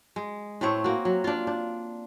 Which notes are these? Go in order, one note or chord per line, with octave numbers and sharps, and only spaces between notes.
G#3
A2 A3 C4 C#5
A#3 F#4
F#3
D4 F4
D4